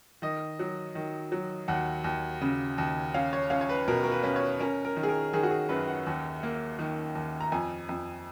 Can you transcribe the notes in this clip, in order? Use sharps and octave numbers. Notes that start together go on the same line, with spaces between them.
D#3 D#5
F#3
D#3
F#3
D#2 F#5
D#2
C#3
D#2
C#4 F5
C#5
C#4 F5
C#5
B4
B2 A#4
A#4
B4
C#4 B4
C#5
C#4 A#4
A#4
D#3
G#4
A#4
D#3 G#4
F#4
G#4
F#2 B4
F#5
D#2
A#3
D#3
D#2
A#5
F2 G#5
F2